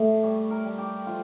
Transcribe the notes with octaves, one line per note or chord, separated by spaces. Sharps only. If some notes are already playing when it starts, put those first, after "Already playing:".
Already playing: A2 A3
G3 C#5
A#4
G3
G4
F3 F4